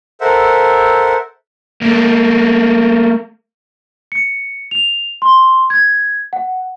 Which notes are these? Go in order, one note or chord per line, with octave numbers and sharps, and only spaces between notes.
A4 A#4 C5 E5 F#5
A3 A#3
C#7
F7
C6
G#6
F#5